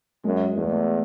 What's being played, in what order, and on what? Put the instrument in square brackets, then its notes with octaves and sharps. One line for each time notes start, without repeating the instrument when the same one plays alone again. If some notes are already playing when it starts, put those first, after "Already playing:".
[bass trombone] F#2 [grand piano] G#3
[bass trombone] E2 [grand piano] A3
[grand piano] G#3
A3